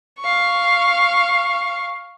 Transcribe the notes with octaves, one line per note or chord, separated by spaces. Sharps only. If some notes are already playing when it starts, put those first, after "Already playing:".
F5 C#6